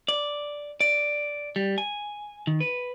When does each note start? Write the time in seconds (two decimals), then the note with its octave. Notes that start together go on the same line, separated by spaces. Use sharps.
0.08 D5
0.80 D5
1.56 G3
1.78 G#5
2.47 D#3
2.61 B4